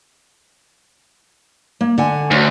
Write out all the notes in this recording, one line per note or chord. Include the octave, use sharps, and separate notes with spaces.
A#3
D3 F#5 G#5
D2 C#4 F#4